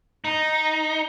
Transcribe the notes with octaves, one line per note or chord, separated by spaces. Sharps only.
D#4